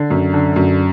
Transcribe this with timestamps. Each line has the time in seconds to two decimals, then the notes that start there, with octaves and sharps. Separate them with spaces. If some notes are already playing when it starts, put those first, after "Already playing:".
Already playing: D3
0.10 F#2
0.33 D3
0.56 F#2